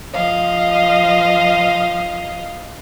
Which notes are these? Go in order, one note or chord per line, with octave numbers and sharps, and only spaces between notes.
F3 D#5 F5